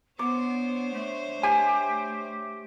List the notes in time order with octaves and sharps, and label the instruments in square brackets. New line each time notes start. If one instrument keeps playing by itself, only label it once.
[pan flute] B3 [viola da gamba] D4 C5 C#5 [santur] D6
[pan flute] A3
[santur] G4 [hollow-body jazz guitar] G#5